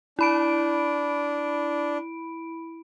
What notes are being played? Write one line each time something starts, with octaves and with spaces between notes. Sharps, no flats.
D4 E4 B5 D7